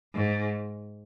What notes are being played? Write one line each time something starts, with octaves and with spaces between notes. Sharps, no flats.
G#2